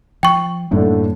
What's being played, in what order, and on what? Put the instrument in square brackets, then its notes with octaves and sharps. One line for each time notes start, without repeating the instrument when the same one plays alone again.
[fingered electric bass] F3 [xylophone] G5 C#6
[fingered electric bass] F#2 G3 A#3 [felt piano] A2 A3 D4 [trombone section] D3